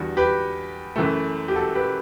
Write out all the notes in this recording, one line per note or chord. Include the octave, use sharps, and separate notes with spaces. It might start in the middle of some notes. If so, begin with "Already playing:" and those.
Already playing: E2 D3 G3 F#4
G4 B4
F#2 E3 A3
G4
F#4 A4
G4 B4